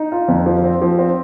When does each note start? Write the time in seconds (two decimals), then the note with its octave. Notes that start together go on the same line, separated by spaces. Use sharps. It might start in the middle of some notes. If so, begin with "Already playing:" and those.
Already playing: D#4
0.12 F4
0.28 F2
0.46 F3
0.64 C4
0.82 F3
0.99 C4